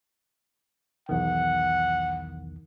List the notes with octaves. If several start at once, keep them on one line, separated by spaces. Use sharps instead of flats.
B1 E2 D#3 F#5